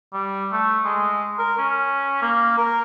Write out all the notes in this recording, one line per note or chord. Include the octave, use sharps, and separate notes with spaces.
G3
A3
G#3
A#4
C#4
A#3
A#4